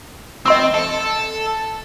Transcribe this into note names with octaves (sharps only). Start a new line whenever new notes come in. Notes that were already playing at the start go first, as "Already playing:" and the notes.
C4 D#5 C6 E6
A4